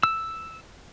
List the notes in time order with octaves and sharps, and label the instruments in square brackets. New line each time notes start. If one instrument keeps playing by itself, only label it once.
[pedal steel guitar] E6